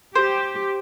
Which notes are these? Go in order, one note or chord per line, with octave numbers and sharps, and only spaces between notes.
G4 C5